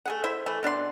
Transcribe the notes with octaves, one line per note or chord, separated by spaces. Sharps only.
A3 G#4 F#5
E4 C5 E5
E3 A3
B2 D4 D5 C6